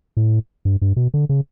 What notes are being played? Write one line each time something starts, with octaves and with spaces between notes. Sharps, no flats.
A2
G2
G2
B2
D3
C#3